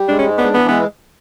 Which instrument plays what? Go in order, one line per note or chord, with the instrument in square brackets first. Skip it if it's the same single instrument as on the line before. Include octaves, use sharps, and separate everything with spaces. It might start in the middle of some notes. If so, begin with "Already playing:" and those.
Already playing: [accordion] G3
[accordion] G#3 [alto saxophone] D4
[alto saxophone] C#4
[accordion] G#2
[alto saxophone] B3 [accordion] D4
[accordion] E3 [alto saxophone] B3
[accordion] G#3 [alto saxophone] B3